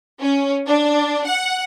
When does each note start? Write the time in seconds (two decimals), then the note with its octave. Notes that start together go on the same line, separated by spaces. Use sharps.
0.21 C#4
0.67 D4
1.27 F#5